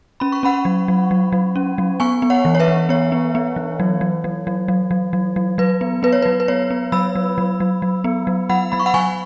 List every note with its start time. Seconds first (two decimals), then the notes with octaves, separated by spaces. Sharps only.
0.20 C#4 B5
0.32 C#6
0.43 C#4 F#5 B5
0.65 F#3
0.88 F#3
1.11 F#3
1.32 F#3
1.56 C#4
1.78 F#3
2.00 B3 G#5 C#6
2.22 B3
2.30 C#5 F#5
2.45 E3
2.55 C#5
2.60 B4 E5
2.68 E3
2.89 B3 C#5
3.12 B3
3.35 B3
3.56 E3
3.80 F#3
4.01 F#3
4.24 F#3
4.47 F#3
4.68 F#3
4.91 F#3
5.13 F#3
5.36 F#3
5.58 F#3 B4
5.81 B3
6.03 B3 B4
6.13 C#5
6.22 F#3 B4
6.40 B4
6.48 B3 C#5
6.70 B3
6.92 F#3 B5 E6
7.15 F#3
7.38 F#3
7.60 F#3
7.82 F#3
8.04 B3
8.27 F#3
8.49 F#3 F#5 B5
8.72 F#3 B5
8.80 C#6
8.86 F#5 B5
8.94 F#3 G#5 C#6